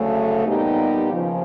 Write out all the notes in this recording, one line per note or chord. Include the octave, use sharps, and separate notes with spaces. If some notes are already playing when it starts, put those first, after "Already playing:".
Already playing: D2 C#3 F#3 A3
A#2 G3 B3 D#4 G4
D#2 C#3 F3